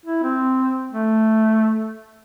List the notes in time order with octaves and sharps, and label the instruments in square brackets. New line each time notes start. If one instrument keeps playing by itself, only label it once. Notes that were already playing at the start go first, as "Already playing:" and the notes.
[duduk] E4
C4
A3